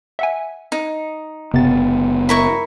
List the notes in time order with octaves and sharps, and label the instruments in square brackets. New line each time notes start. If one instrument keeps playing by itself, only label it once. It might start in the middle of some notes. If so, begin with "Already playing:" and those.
[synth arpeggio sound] E5 F#5 G#5
[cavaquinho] D#4
[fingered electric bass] F#1 B3 [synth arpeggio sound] C3 A6
[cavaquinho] E4 A#4 C#6